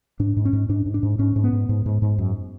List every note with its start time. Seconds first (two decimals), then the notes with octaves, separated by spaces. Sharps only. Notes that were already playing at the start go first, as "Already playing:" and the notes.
0.20 G#2 D4
0.37 G#2
0.45 C#4
0.53 G#2
0.69 G#2 D4
0.86 G#2
0.94 D4
1.03 G#2
1.19 G#2 C#4
1.36 G#2
1.44 B3
1.53 G#2
1.69 G#2
1.86 G#2
2.02 G#2
2.18 F#2